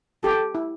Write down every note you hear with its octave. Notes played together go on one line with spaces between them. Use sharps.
G4 A4
E4